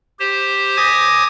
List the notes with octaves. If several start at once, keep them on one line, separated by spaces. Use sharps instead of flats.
G4 C5
G#5 D6 D#6 G#6 A#6